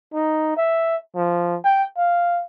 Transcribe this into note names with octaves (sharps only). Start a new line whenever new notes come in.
D#4
E5
F3
G5
F5